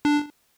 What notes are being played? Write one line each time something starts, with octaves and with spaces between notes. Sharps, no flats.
D4